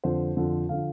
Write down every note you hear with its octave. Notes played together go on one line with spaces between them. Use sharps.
F2 D3 F3 C5
F2 D3 F3
D3 F3 F5